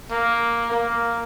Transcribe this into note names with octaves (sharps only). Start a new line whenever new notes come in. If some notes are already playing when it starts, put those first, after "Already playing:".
A#3
A#3